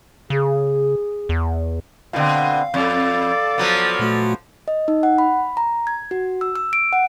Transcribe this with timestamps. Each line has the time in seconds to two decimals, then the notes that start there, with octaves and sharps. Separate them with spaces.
0.30 C#3 G#4
1.29 E2
2.13 B2 D3 C4 F5
2.74 F2 A4 D5
3.58 F3 F#3 B3
3.99 A#2 A3 F#4
4.68 D#5
4.88 D#4
5.03 F#5
5.18 B5
5.57 A#5
5.87 G#6
6.11 F#4
6.41 E6
6.56 E6
6.73 D7
6.93 F#5